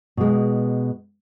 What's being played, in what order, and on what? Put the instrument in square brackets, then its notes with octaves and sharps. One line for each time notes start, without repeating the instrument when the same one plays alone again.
[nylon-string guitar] B2 G#3